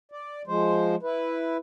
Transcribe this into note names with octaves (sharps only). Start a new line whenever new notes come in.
D5
F3 G#3 C5
E4 B4